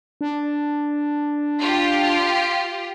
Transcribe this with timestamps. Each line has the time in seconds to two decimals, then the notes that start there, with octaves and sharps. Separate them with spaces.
0.21 D4
1.60 F4 G4